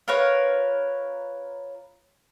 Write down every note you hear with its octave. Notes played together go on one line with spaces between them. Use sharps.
F4 A#4 B4 C#5